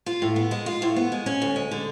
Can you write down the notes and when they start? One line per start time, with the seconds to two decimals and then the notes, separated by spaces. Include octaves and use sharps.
0.06 F4
0.22 A2
0.36 B3
0.51 G#3
0.66 F4
0.82 A2
0.96 B3
1.12 G#3
1.26 C#4
1.42 D2
1.56 G#3
1.71 D3